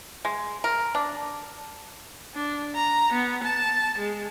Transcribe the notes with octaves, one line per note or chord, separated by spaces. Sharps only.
G#3
A#4
D4
D4
A#5
B3
A5
G#3